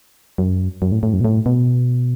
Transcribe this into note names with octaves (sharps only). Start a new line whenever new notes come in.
F#2
F#2
A2
A2
F#2
B2
A2
B2